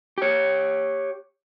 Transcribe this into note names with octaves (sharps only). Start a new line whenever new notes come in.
G4 C#5